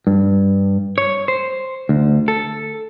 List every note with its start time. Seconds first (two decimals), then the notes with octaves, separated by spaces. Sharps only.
0.07 G2
0.98 C#5
1.28 C5
1.89 D2
2.28 A4